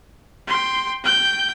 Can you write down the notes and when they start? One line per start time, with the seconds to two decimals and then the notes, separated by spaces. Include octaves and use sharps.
0.47 G5 C6
1.04 G5 G6